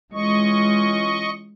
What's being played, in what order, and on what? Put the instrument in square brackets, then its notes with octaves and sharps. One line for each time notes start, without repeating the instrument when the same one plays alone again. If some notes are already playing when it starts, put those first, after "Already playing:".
[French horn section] E3 C#4 F4 [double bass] G#3 [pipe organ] D#5 C#6